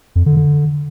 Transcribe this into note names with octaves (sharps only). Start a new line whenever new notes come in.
F2
D3
D3